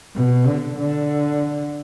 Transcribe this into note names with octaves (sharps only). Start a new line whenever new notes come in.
B2
D3
D3